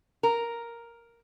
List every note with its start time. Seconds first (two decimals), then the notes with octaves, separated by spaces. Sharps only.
0.23 A#4